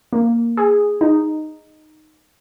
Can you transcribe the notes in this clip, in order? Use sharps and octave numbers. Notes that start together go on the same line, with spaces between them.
A#3
G#4
D#4